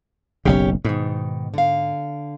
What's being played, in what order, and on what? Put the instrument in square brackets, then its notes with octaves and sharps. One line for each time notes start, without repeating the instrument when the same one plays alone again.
[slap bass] F#1 B1 C#3 [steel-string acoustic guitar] C#4 G4
[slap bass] G#2 [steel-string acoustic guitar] B2 D#3
[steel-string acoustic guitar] D3 F5